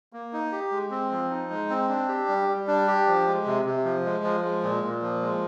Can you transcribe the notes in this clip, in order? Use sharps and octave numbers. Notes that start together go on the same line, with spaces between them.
A#3
D#4
G4
G#3
C4
F3
D#4
G#3
C4
D4
G4
G3
G3
D4
G4
F3
G#3
C3
C3
F3
G#3
F3
G#3
A#2
A#2
F3
G#3